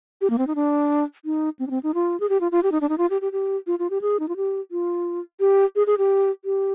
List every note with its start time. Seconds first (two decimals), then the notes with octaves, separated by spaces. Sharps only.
0.21 G4
0.30 A#3
0.38 C4
0.47 D#4
0.55 D4
1.25 D#4
1.59 C4
1.67 D4
1.71 C4
1.83 D#4
1.95 F4
2.20 G#4
2.29 G4
2.41 F4
2.52 F4
2.63 G4
2.72 D#4
2.81 D4
2.89 D#4
2.98 F4
3.10 G4
3.22 G4
3.32 G4
3.67 F4
3.79 F4
3.90 G4
4.02 G#4
4.20 D#4
4.29 F4
4.37 G4
4.71 F4
5.40 G4
5.76 G#4
5.87 G#4
5.98 G4
6.45 G4